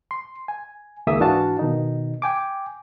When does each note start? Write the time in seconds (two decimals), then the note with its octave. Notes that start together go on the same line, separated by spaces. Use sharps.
0.11 C6
0.48 G#5
1.07 C#2 D#3 A#3 G#4 E5 D#6
1.20 G#2 E3 D4 F#4 F5 A5
1.59 B2 D#3 D#4
2.22 G5 G#5 D6